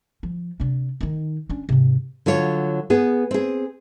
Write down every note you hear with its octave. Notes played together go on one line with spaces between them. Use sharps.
F3
C3 D4
D#3 D#4
C#4 D4
G#2 C3
D3 F#3 F4 C#5
B3 G#4
C4 G#4